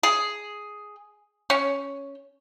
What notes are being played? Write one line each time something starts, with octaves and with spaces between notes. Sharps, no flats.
G#4
C#4